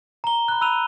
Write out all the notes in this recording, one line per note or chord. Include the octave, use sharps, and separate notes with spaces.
A#5 G7
B5 F#6
B5 E6 F#6 D#7 F7